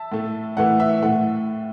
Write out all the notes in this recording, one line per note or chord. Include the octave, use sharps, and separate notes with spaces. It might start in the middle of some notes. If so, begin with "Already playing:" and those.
Already playing: E5 A5
A2 A3
A2 E3 A3 F#5
E5
A2 A3 F#5